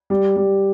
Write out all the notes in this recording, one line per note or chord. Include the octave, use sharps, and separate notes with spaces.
G3
G3